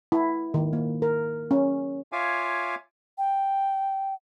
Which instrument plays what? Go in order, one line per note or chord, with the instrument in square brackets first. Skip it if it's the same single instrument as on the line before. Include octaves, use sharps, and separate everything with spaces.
[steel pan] E4
D#3
A#3
A#4
C#4
[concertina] F4 C#5 E5 F5 G#5 D6
[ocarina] G5